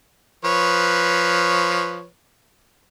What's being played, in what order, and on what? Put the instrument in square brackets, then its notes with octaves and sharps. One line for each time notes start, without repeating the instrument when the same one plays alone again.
[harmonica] F3 B4 C#5